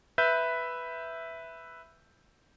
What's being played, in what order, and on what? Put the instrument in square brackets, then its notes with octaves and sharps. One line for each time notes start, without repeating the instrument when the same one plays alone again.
[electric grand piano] B4 E5 G6